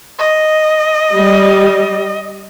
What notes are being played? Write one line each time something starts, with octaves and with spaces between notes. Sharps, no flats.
D#5
G3